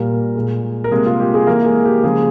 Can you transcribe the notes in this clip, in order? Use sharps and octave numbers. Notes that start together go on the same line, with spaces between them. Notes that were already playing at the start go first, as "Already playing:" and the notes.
Already playing: A#2 G3 A#3 A#4
A#2 G#3
A#4
C3 G3 G#3 A#3 G#4
F4
G4
G#3 G#4
E3 G#3 A#3 A#4
G#3 G#4
G4
C#3 F3 G#3 A#3 G#4